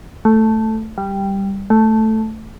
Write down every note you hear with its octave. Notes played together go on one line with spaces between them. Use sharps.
A3
G3
A3